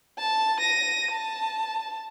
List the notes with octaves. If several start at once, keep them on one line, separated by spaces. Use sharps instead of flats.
A5
A#6 D#7
A5